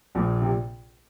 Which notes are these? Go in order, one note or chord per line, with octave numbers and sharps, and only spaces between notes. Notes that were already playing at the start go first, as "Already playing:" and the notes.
A#1 A#2
C3